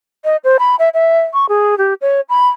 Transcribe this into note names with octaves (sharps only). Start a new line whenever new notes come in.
D#5
C5
B5
E5
E5
C#6
G#4
G4
C#5
B5